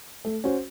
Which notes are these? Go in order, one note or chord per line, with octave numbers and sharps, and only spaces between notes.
A3
C#4 F#4 C5